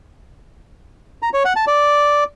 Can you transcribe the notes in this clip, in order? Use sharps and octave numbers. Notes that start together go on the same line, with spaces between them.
A#5
C#5
F#5
A5
D5